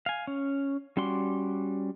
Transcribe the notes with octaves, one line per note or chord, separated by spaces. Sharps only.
F5 G#5
C#4
G3 C#4 F#4 D5 C6